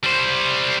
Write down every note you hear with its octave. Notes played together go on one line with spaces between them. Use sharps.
G3 C5